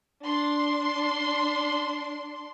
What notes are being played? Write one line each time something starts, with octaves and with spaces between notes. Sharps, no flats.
D4 C6